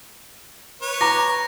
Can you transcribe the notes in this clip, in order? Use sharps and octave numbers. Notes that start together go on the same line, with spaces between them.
B4 C#5
A#5 D6 A#6